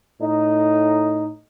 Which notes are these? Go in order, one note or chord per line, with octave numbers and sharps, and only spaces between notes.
A2 D#4